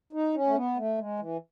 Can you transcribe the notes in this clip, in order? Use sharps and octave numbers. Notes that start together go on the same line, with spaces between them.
D#4
C#4
A3
B3
A3
G#3
E3